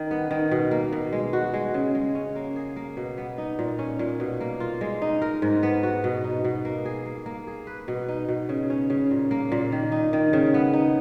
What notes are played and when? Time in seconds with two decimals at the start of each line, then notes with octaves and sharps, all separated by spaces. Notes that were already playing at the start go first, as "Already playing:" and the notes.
Already playing: D#3
0.11 B3
0.31 D#3
0.51 B2
0.71 A#3
0.92 B2
1.13 G#3
1.33 F#4
1.54 G#3
1.74 C#3
1.95 G#3
2.15 C#4
2.36 A#3
2.56 G#4
2.76 A#3
2.97 B2
3.18 B3
3.38 D#4
3.59 A#2
3.79 C#4
3.99 A#2
4.20 B2
4.40 A#3
4.60 F4
4.81 G#3
5.02 D#4
5.22 A#4
5.42 G#2
5.63 B3
5.83 F#4
6.04 B2
6.24 D#4
6.44 B2
6.65 A#3
6.85 G#4
7.06 A#3
7.26 A#3
7.47 G#4
7.67 B4
7.88 B2
8.08 D#4
8.29 B2
8.49 C#3
8.70 C#4
8.90 C#3
9.11 A#2
9.31 A#3
9.52 A#2
9.72 D#3
9.92 D#4
10.13 D#3
10.33 C#3
10.54 B3
10.74 D#4